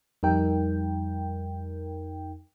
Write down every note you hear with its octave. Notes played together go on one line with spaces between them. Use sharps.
F2 G3 D#4 A#4 G5